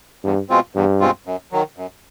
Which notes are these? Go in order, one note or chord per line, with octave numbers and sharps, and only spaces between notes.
E2 G2
B2 G#3 C4 F4
E2 G2
B2 G#3 C4 F4
F#2
D#3 F#3
F#2